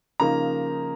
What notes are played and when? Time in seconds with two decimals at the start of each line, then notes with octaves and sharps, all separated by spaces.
0.20 C#3 F3 A#3 D#4 A#5